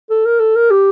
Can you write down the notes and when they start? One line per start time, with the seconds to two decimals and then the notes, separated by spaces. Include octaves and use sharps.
0.10 A4
0.26 A#4
0.40 A4
0.56 A#4
0.70 G4